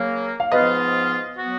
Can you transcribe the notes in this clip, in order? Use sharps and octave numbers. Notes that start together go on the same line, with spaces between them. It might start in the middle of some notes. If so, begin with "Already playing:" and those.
Already playing: C#3 F#3 A#3 F5
F5
G#2 F3 B3 F4 B4 D#5
F#3 B3 F#4